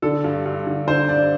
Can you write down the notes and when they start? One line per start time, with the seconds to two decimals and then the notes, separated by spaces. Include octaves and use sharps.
0.02 D3 A4
0.24 G2
0.46 G2
0.67 D3
0.87 D3 C5
1.09 G2 D5